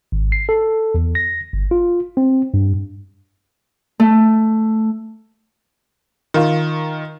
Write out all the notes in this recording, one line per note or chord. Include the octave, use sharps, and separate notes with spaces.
G#1
C7
A4
E2
A#6
G1
F4
C4
G2
A3
D#3 F4